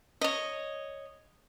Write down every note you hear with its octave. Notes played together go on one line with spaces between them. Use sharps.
C#5 D#5